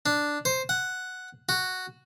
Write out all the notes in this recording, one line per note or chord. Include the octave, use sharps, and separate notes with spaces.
D4
C5
F#5
F#4